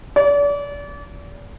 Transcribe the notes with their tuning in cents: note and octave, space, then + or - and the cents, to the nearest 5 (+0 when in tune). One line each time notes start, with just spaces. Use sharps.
D5 -35